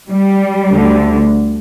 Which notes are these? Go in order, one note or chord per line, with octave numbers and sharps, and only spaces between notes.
G3
D2 D3